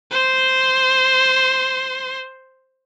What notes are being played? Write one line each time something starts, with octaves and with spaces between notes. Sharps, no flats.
C5 C6